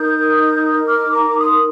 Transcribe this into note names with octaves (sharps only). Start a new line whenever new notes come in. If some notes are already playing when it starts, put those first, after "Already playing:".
Already playing: D#4 A#4 D#6 G6
D6 F6
A#5 D6
C6 D#6